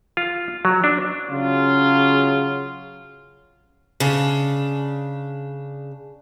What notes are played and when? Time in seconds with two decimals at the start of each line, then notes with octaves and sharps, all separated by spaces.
0.17 F4
0.65 F#3
0.84 D4
1.28 C#3 F#3 F4
4.00 C#3 D4